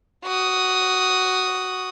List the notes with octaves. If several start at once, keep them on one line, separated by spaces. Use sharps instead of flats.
F#4 D#6